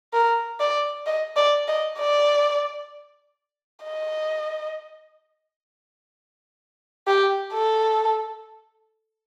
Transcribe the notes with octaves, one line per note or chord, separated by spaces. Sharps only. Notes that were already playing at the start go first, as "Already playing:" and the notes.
A#4
D5
D#5
D5
D#5
D5
D#5
G4
A4